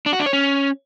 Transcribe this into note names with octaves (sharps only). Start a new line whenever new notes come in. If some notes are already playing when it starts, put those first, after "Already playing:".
D4
F#4
D4
C#5
C#4